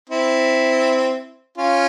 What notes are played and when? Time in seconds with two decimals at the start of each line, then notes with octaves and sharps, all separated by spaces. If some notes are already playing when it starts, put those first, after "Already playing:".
0.09 C4 E4
1.58 C#4 F4